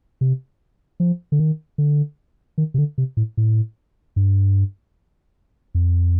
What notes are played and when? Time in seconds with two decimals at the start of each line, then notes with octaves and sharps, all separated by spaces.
0.21 C3
1.00 F3
1.32 D3
1.39 D#3
1.78 D3
2.58 D#3
2.74 C3
2.78 D3
2.98 C3
3.17 A2
3.37 A2
4.16 G2
5.75 F2